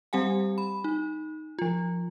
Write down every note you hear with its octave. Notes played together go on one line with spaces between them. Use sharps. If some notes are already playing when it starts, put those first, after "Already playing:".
G3 C4 G4 F#5 G#5
B5
D#4
F3 F4